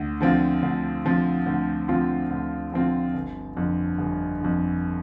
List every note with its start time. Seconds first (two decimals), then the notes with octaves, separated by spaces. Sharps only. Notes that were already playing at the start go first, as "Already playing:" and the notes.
Already playing: D2
0.21 D3 F3 C4 F4
0.63 D2
1.05 D3 F3 C4 F4
1.46 D2
1.88 D3 F3 C4 F4
2.31 D2
2.72 D3 F3 C4 F4
3.14 G1
3.57 F2 D3
3.98 G1
4.40 F2 D3